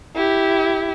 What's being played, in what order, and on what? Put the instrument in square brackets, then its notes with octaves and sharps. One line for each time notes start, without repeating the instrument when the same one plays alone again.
[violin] E4 G4